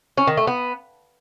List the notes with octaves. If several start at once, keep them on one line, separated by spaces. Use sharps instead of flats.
C#4
D#3
A3
B3